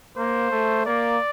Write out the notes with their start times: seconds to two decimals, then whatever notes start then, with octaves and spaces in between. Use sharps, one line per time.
0.17 A#3 C5
0.51 A3
0.86 A#3 D5